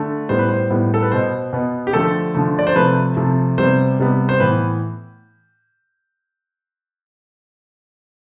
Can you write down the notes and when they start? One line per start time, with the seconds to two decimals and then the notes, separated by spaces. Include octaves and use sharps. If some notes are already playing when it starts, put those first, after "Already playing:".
Already playing: D3 A3
0.29 A2 G3 B3 C5
0.39 B4
0.49 C5
0.70 A2 G3 B3
0.94 A4
1.02 B4
1.11 B2 B3 C5
1.53 B2 B3
1.87 G4
1.93 D3 F3 A3 A4
2.35 D3 F3 A3
2.59 D5
2.67 C5
2.76 C3 F3 A3 B4
3.16 C3 F3 A3
3.58 C3 G3 B3 C5
3.99 C3 G3 B3
4.29 C5
4.40 A2 E3 B3 B4